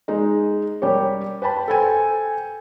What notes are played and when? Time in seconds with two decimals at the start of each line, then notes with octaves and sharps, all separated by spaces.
0.08 G#3 D#4
0.82 G3 G4 A#4 C#5
1.42 B4 G5 A5 B5
1.68 A4 C5 G5 G#5